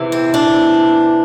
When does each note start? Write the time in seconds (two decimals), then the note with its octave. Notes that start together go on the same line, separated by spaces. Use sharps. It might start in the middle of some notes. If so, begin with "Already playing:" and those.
Already playing: E2 C3 E3
0.12 C4
0.34 D4